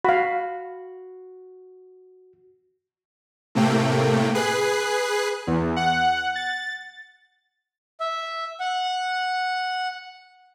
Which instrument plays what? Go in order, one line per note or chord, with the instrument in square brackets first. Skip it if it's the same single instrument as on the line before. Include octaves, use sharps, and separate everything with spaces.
[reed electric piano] F#4 [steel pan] F5 B5
[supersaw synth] A2 C3 A3 A#3 G5
G#4 B4 F#6 C7
E2
F#5
A6
[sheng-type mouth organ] E5
F#5